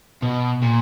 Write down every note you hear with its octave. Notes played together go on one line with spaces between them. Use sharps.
B2
A#2